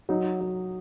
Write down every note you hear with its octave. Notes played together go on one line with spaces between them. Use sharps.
F#3 D#4
F#3